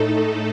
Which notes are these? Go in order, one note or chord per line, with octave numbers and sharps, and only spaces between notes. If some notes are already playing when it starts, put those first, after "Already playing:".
Already playing: A2 A3 D#4 A4